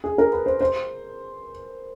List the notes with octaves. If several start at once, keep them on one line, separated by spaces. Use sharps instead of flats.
G#4
A#4
B4
C5
C5